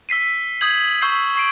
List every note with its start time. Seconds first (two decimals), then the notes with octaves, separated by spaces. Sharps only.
0.09 E6 B6 C7 D#7
0.61 D#6 G6 G#6 F#7
1.02 C#6 E6 G6 B6 C7
1.36 C#6 C7 D7